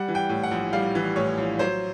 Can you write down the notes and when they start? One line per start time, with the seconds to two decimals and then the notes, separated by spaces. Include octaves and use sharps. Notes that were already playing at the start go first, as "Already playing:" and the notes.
Already playing: G3 F#5
0.08 E3
0.15 G5
0.29 A2
0.43 F#5
0.51 A#1
0.73 G3 F5
0.95 E3
1.16 A2 C#5
1.38 A#1
1.59 F#3 C5